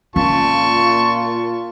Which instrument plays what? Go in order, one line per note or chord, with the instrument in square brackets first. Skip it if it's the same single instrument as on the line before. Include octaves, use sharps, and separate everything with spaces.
[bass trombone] A#2 [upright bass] C#4 [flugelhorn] F4 [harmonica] A5 C#6